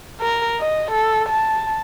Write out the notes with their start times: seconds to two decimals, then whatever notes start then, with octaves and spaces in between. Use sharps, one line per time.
0.21 A#4
0.60 D#5
0.91 A4
1.29 A5